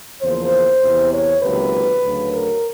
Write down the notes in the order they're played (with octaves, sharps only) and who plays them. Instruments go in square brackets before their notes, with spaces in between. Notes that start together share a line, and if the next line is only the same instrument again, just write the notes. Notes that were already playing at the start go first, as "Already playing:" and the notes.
[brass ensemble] E2 C#3 F3 A#3 C5
E2 C3 E3
C#5
C#2 C3 D#3 F#3 A#3 B4
D2 C#3 F#3
A#4